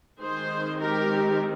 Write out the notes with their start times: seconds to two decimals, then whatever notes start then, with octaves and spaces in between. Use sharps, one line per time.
0.20 D#3 G#3 C4 G#4 C5
0.81 G4 A#4